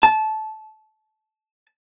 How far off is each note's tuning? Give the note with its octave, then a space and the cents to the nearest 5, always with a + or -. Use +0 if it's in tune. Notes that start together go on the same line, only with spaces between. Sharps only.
A5 -20